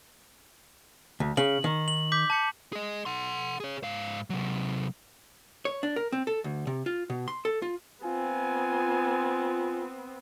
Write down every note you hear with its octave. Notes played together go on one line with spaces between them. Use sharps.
D2
C#3 F#7
D#3
F#7
D6 G6 B6
A5 G6 C#7
G#4 D#5
F#5 C6
G#4 C#5
G#2 F5
C3 F#3
C#5
D4
A#4
C4
A4
D2
C3
F4
B2
C6
A4
F4
B3 C4 F4 G#5